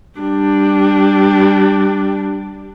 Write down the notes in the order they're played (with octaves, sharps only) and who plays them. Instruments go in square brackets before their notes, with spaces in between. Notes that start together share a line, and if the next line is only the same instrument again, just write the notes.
[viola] G3 D4